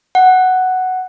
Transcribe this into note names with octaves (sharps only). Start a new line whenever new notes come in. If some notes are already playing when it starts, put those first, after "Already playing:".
F#5